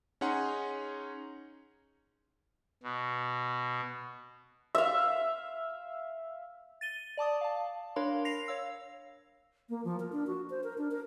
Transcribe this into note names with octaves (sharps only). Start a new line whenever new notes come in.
C#4 D#4 G#4 F#5 A#5 C6
B2
E5 F5
A6 D#7 G7
D5 A5 D6 D#6
F5 A5
D4 A#4 C#5 F5 B5 C6
A#6 C7 F7
C#5 F5 E6
A#3
F3
A#4
D4
F#4
C5
A#4
D4
A#4